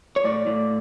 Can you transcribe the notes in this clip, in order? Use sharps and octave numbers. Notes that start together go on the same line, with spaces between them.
C#5
A2 D5
A2